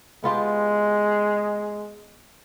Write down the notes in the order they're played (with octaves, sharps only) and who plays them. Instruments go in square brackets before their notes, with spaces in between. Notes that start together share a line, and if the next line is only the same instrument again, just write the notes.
[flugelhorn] G#3 [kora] B3 F4 G4